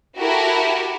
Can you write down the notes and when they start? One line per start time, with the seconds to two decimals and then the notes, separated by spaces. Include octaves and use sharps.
0.17 E4 F#4 G4 A4 A#4